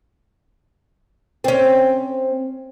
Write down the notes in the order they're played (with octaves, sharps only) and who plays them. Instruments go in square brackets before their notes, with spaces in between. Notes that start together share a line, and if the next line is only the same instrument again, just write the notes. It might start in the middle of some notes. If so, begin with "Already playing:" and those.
[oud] C4 C#4